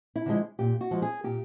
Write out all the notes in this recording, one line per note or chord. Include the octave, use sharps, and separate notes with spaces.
E4
D3 F3 G#3
A#2 G4
F#4
F3 G#3
G#4
A#2 G4